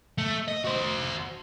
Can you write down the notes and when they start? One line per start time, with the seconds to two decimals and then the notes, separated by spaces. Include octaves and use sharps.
0.18 A3
0.48 D#5
0.64 F#4 C5